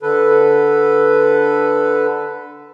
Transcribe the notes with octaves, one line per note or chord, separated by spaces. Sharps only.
D3 A4 B4